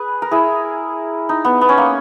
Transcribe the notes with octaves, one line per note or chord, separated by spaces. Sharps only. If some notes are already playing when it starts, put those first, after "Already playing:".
Already playing: G#4 B4
A#4
E4 G#4
D#4
B3
B3
C#4
A#3